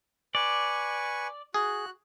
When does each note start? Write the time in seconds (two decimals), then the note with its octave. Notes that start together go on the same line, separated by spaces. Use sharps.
0.35 B4 D5 G#5 C#6
1.54 F#4 G#4 F#6